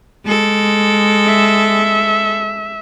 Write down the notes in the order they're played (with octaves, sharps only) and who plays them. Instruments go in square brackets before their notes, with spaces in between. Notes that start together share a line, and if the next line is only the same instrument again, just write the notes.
[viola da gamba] G#3 A4
[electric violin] E5